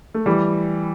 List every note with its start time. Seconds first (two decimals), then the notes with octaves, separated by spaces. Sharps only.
0.14 A3
0.26 E3 G3